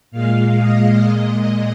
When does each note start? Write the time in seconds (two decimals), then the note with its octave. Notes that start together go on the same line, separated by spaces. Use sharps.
0.12 A#2 G#3 F5
0.59 D#5
1.06 A#2 G#3